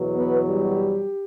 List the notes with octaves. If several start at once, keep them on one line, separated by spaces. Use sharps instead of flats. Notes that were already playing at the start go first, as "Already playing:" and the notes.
Already playing: E2 B2 F#3
B3 B4
G3 G4